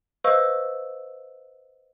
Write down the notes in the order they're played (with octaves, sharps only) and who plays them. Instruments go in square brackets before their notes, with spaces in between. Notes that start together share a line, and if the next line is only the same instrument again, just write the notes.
[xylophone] B4 C5 D#5 F5 C#6 E6